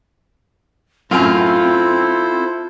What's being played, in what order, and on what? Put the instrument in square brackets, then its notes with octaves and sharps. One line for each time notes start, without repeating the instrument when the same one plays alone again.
[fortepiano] F#2 A2 G#5 [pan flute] C4 [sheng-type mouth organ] E4 A4 C5 [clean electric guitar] F4